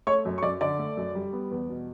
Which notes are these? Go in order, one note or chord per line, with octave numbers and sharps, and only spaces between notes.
A3 C#5 C#6
F#2
C#6
F#2 D5 D6
D3 D5 D6
A3
F#2
G3
B3
E2
B2